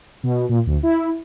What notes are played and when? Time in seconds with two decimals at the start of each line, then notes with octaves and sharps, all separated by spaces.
0.23 B2
0.49 A#2
0.66 D2
0.83 E4